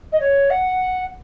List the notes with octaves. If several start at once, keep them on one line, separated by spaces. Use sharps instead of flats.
D#5
C#5
F#5